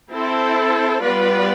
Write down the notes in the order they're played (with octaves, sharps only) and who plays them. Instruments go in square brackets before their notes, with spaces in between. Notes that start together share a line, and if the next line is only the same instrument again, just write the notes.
[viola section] C4 E4 A4 C5
G3 B3 F4 B4 D5